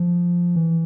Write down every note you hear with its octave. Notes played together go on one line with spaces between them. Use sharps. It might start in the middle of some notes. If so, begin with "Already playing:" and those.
Already playing: F3
E3